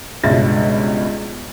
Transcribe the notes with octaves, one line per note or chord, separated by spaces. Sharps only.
C#2 G2 B2 E5 A6